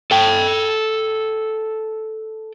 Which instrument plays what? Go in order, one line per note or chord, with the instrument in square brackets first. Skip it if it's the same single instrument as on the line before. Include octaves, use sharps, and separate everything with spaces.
[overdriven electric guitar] A4 G5